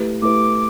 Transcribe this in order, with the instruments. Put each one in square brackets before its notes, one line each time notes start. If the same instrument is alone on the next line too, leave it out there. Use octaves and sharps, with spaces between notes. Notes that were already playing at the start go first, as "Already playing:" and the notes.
Already playing: [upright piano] A3 E4 G4 B4
[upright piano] A3 E4 G4 B4 [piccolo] D6